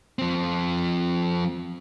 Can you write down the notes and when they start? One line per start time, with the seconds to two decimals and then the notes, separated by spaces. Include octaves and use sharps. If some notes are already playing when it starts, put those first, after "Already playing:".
0.19 F3 C4